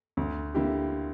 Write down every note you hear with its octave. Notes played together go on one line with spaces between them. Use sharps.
D2
D3 A#3 E4 G4